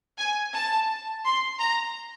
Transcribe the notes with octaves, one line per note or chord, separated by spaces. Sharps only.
G#5
A5
C6
A#5